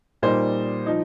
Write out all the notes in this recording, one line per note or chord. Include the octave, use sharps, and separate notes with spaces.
A#2 G3 D#4 C5
F3 D#4